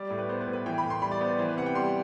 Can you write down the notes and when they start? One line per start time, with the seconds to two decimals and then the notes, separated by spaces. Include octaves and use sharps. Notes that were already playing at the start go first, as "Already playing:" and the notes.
Already playing: G3 D5
0.10 A2
0.18 B4
0.29 B3 C5
0.41 B4
0.47 A2
0.53 B4
0.66 E3 G5
0.78 B5
0.83 A2
0.90 C6
1.02 G3 B5
1.11 D5
1.21 B3 C5
1.29 D5
1.38 E3 C5
1.49 B4
1.57 C3 F#5
1.66 G5
1.75 G3 C6